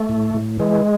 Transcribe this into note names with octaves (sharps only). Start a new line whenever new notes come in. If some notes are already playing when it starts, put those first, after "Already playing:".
Already playing: A3
A2
A2
E3 G#3